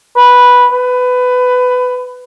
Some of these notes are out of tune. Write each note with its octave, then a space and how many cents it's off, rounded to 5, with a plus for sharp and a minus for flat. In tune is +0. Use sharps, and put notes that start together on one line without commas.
B4 -5
B4 +20